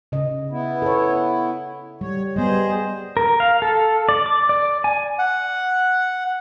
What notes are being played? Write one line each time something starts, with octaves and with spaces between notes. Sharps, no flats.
C#3 D#5
B3 E4
A4 C#5
G3 C#5
G3 B3 G#4 C5 D#5
A#4
F5
A4
D5
D6
D5
G#5
F#5